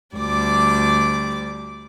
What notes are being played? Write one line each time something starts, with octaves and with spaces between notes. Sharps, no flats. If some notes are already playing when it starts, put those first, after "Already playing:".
D2 G3 D5 D6